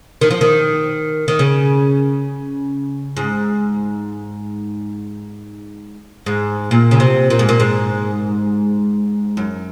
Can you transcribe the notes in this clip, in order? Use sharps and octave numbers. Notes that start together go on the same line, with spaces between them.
D#3
F3
D#3
D#3
C#3
G#2
G#2
A#2
C#3
C3
A#2
G#2
A#2
G#2
F#2